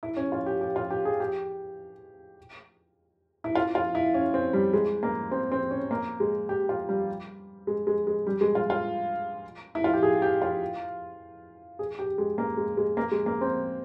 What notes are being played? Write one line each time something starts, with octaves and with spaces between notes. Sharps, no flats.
E4
C#4
F4
G4
G4
F4
G4
G#4
G4
E4
F4
F4
E4
C#4
C4
G3
G#3
A#3
C4
C4
C#4
A#3
G#3
G4
F4
G3
G#3
G#3
G#3
G3
G#3
F4
F4
E4
F4
G4
G#4
G4
F4
G#4
G4
G#3
A#3
G#3
G#3
A#3
G#3
A#3
C4